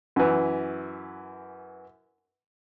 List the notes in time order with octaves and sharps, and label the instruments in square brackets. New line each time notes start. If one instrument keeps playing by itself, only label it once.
[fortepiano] F#2 E3